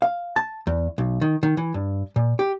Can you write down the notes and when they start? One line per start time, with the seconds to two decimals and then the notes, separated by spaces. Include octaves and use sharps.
0.02 F5
0.36 A5
0.67 E2
0.98 B1
1.21 D#3
1.43 D#3
1.57 E3
1.74 G2
2.16 A#2
2.39 G4